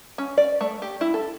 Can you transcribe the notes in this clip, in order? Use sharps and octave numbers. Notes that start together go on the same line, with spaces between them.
C#4
D5
A3
G4
E4
A4